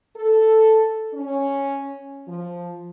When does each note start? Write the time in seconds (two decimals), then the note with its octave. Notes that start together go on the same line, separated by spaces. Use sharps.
0.16 A4
1.14 C#4
2.27 F3